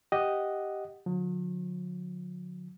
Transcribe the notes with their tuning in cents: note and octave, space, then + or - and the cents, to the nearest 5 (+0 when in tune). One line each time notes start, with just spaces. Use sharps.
G4 +0 D#5 +0 F#5 +0
D3 +0 F#3 -45